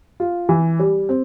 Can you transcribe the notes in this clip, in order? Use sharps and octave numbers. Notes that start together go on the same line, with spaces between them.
F4
E3
G3
C4